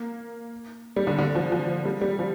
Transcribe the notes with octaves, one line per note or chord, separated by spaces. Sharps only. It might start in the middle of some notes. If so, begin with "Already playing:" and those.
Already playing: A#3
G3
D3
D3
F3
F3
G3
G3
F3